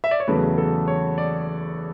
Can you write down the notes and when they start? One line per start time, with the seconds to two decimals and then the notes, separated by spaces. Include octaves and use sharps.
0.04 E5
0.11 D5
0.20 C#5
0.28 E2 C#3 F#3 A3 B4
0.58 A4
0.88 C#5
1.18 D5